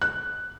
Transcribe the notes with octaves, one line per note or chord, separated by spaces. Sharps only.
F#6